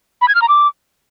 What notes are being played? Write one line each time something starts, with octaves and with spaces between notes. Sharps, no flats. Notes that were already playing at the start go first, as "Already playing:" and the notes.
B5
G#6
F6
A#5
D6